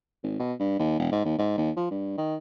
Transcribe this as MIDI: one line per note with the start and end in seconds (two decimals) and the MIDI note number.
0.23 0.39 32
0.40 0.53 47
0.60 0.77 43
0.79 0.95 39
0.99 1.11 28
1.12 1.23 44
1.25 1.38 39
1.38 1.55 44
1.58 1.71 39
1.77 1.86 53
1.91 2.13 43
2.18 2.36 51